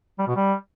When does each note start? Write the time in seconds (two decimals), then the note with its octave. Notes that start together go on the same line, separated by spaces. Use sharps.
0.19 G3
0.27 B2
0.36 G3